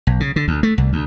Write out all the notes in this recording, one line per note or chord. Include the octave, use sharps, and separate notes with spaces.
B1
C#3
D3
D2
A3
C2
D2